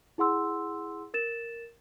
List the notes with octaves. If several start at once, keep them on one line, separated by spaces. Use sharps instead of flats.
E4 G#4 F#5 C6 E6
A#4 A6 E7